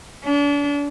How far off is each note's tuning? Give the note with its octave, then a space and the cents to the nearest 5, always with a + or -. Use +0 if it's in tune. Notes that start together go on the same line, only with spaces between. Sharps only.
D4 -35